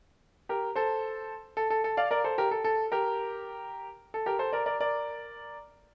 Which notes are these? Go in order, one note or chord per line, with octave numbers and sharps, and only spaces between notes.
G4 A#4
A4 C5
A4
A4
A4
D5 F5
A#4 D5
A4 C5
G4 A#4
A4
A4
G4 A#4
A4
G4 A#4
A4 C5
A#4 D5
A#4 D5
A#4 D5